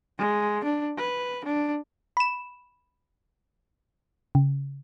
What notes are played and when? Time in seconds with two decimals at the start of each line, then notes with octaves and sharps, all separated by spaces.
0.19 G#3
0.64 D4
0.97 B4
1.45 D4
2.17 B5 E7
4.35 C#3